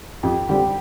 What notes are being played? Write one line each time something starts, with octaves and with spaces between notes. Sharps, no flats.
F2 G4
D3 G3 C4 G4